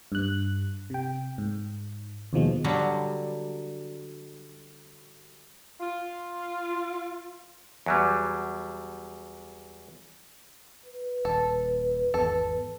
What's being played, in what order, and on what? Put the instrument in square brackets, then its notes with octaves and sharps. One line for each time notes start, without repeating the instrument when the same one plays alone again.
[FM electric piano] G2 F#6
C3 G5
G#2
D#2 B2 F3 G#3
[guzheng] D3 F#3 G3
[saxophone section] F4
[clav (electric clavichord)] E2 F#3 G3
[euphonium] B4
[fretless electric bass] D#1 [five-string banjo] A4
[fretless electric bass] G#1 E2 [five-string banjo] A4